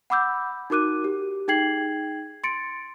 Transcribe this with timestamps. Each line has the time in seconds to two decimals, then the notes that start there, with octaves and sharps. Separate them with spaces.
0.10 F#5 B5 D6 E6 G6
0.70 D#4 F#4 A#4 D6 F#6 D#7
1.04 G4
1.48 D#4 G#4 G5 G#6 C7 F#7
2.44 C6 A6 C#7 D7